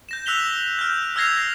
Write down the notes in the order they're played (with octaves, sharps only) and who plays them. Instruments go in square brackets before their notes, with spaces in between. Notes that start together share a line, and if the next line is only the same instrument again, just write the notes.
[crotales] G6 A#6 E7
E6 F#6 B6 F7 G7
F6 G6
E6 F6 G#6 A#6 C7 F7